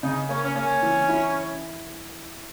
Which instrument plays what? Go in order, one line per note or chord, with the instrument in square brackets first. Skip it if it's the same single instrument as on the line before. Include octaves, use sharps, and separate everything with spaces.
[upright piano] C#3 [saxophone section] D#4
[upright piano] A#3 [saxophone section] C#4
[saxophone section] C#4
[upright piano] A#3 [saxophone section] C#4
[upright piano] E3
E4